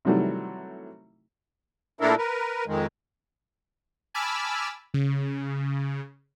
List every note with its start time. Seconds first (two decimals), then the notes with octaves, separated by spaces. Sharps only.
0.05 C3 D#3 E3 F#3 G3 A3
2.01 A#2 A3 D4 E4 A4 A#4
2.18 A#4 B4
2.67 F2 D#3 G#3
4.14 G#5 A5 B5 D6 E6 F6
4.94 C#3